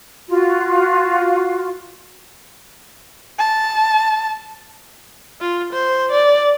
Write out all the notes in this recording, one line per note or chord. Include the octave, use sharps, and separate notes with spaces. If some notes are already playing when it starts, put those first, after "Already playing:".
F4 F#4
A5
F4
C5
D5